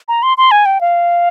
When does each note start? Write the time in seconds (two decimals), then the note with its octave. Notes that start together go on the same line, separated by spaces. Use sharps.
0.08 A#5
0.23 C6
0.38 C6
0.51 G#5
0.66 G5
0.81 F5